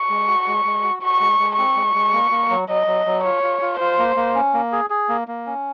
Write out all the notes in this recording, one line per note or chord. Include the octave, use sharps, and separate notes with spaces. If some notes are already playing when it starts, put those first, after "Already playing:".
Already playing: C#6
G#3
F#4
G#3
G#3
F#4
F#4 C#6
G#3
G#3
C4 C#6
G#3
G#3
A#3
A#3
F#3
F#3 D#5
F#3
F#3
F4 C#5
F4
F4
F4 C5
A#3
A#3
C#4
A#3
G#4
G#4
A#3
A#3
C#4